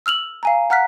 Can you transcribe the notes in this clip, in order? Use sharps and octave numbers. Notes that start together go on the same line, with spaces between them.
E6 F6 F7 F#7
F5 G#5 A#5
F#5 A#5 F6 F#6 B6